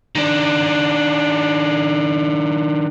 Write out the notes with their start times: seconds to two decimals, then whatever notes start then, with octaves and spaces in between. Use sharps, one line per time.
0.15 D#3 D4